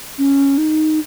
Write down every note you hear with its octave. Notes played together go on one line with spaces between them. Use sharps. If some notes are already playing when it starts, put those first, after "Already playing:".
C#4
D#4